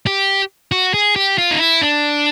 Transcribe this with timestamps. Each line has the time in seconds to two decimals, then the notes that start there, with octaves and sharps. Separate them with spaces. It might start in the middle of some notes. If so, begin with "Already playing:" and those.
0.07 G4
0.72 F#4
0.94 G#4
1.16 G4
1.38 F4
1.51 D#4
1.59 E4
1.82 D4